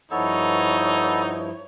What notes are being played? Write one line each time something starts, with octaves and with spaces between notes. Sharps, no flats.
G2 F3 B3 D#4 E4 A4 C#5